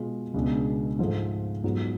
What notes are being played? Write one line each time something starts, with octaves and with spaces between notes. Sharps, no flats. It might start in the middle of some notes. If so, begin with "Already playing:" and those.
Already playing: B2 G#3 B3 F4
C#2 B2 G#3 B3 D4
G#2 F3 A3
G#2 F#3 B3 F4